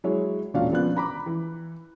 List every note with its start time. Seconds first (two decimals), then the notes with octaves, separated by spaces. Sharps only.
0.04 F#3 G#3 E4 C#5
0.54 E1 A#2 C#4 D4 F#4 F5
0.71 C#3 F3 B3 D4 F#6
0.96 A#5 B5 D6
1.26 E3